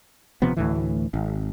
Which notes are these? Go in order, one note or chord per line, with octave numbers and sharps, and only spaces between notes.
D#1 C3 F3 B3
D2 A2 E3
G#1